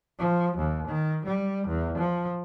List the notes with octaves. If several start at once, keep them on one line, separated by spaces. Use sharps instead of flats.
F3
D#2
D#3
G3
E2
F3